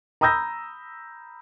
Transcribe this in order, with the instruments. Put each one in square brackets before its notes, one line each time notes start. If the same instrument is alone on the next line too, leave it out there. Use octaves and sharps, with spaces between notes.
[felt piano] A#5 B5 D#6 E6 G6 A#6